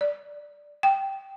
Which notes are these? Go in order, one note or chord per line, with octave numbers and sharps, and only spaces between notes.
D5
G5